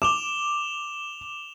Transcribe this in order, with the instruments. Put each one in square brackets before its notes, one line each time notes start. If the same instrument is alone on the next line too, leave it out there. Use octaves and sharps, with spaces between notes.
[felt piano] D6 [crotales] E7 F7 G7